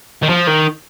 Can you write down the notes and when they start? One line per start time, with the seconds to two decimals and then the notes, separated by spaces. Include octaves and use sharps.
0.23 D#3
0.29 F3
0.47 D#3